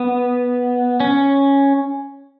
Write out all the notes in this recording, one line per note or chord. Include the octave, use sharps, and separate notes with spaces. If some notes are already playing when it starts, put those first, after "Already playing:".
Already playing: B3
C#4